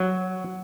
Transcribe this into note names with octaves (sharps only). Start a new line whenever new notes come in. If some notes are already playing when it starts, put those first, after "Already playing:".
Already playing: F#3